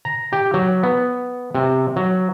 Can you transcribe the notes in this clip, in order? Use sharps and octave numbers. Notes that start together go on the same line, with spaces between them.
A#5
G4
F#3
B3
C3
F#3